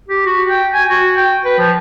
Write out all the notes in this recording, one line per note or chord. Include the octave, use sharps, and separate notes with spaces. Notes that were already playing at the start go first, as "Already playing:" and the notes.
G4
F#4
G5
G#5
F#4
G5
B4
F3